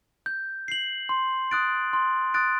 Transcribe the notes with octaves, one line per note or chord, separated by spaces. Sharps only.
G6
C7 F#7
C6
D#6 F#6 A6 D7
C6
D#6 F#6 A6 D7